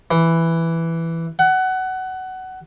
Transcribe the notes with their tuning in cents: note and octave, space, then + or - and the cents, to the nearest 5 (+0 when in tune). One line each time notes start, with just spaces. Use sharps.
E3 +5
F#5 +20